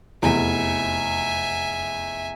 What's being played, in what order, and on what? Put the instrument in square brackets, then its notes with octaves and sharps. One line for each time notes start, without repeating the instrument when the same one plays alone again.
[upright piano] F1 E2 [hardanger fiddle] E5 G#5